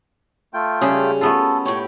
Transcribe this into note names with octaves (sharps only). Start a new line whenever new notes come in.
A3 F4 G5
C#3 G3 C#4 G#4
A3 B3 F4 A4
A2 G4 C#5